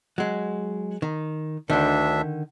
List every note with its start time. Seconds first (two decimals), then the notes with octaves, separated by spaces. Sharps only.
0.18 F#3 G#3
1.02 D#3
1.70 D2 D3 D#3 D4 E5